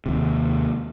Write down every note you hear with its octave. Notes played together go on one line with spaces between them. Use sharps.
D#2 C3